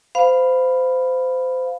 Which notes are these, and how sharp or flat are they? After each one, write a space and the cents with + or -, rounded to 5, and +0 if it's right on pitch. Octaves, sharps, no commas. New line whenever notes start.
C5 -25 F5 +0 B5 +0